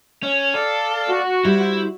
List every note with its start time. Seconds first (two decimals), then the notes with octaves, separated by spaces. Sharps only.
0.23 C#4
0.54 A4 D5 F5
1.09 F#4
1.45 G3 E4 C5